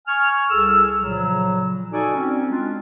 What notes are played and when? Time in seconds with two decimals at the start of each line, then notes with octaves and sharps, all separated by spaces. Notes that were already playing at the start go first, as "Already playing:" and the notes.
0.07 G#5 C#6 F6
0.49 C2 G#4 A4 E6
0.99 A#2 C#3 F3 F#3
1.92 D#4 F#4 A4 D5 G#5
2.15 C4 C#4
2.50 G#3 D4 F4